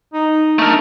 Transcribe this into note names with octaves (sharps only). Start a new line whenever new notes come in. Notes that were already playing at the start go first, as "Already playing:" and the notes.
D#4
A3 D4 A#4